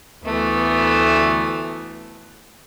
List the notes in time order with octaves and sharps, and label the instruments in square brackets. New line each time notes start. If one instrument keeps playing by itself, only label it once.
[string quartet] D2 E3 A3 B3